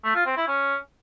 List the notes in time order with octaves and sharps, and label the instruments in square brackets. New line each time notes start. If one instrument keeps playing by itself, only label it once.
[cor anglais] A3
F4
C4
E4
C#4